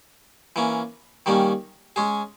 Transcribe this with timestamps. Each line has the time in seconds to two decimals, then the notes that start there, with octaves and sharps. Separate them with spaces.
0.56 E3 A#3 C#4
1.26 D#3 G3 A#3 C#4
1.96 G#3 C#4 G#4